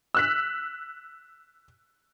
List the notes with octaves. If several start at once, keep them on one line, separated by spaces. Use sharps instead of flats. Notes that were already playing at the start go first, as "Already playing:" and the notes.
E6 F#6 B6